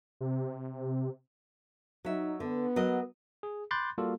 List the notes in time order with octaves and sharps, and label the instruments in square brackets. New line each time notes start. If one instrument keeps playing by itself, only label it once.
[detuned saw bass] C3
[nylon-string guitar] F#3 E5 [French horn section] D#4
[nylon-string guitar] D3 [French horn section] B3
[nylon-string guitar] F#3 A#4 D#5
[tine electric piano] G#4
B5 C6 D6 F#6 G6 A6
G3 A#3 F4 F#4 A4